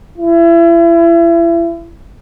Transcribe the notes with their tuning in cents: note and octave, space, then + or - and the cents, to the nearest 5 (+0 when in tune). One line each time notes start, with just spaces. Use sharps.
E4 +35